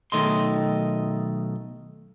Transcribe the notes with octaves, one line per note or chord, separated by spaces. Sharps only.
B1 D#3 A3 D#5 C6